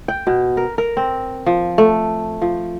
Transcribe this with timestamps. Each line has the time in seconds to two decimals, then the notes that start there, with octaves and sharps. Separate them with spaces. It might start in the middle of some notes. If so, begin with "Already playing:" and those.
0.08 G5
0.27 B2
0.57 A#4
0.78 A#4
0.97 C4
1.46 F3
1.78 A3
2.42 F3